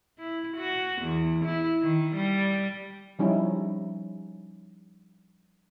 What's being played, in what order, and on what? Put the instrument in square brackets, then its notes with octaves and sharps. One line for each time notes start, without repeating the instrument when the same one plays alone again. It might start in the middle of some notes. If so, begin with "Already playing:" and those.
[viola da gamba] E4
F#4
E2
E4
D#3
G3
[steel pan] F3 G3 C#4 D#4 E4